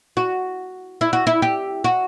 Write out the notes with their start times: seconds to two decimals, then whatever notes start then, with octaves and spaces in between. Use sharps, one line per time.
0.17 F#4
1.01 E4
1.13 F#4
1.27 E4
1.42 G4
1.84 F#4